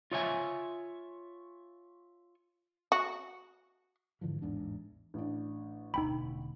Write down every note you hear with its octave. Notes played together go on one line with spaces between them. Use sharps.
F4 C#5 E5 G#5
F#4
G#2 D3 E3 F3
A1 E2 G#2 D4
A1 D4
E1 D2 D#4 G5 B5